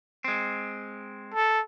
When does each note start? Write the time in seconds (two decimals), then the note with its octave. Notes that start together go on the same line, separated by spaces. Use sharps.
0.24 G#3 C4
1.34 A4